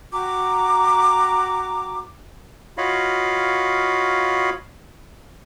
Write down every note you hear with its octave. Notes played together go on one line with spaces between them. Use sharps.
F#4 G5 A#5 D6
F4 F#4 C#5 D#5 F5 B5